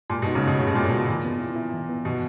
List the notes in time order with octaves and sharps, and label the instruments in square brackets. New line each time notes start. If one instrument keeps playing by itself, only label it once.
[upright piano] A#2 [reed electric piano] G#3
[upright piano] B2
[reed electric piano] D#4
[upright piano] C#2 C#3
[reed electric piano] G#3
[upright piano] B2
[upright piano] C#3 [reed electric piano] G#3
[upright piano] B2
[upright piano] A#2 [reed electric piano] G#3
[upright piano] B2
[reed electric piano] B3
[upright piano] A#2 [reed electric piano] E3
[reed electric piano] B3
E4
E4
E3
B3
[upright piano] B2 [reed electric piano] D#3